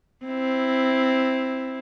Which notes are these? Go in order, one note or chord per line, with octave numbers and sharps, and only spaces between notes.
C4 E4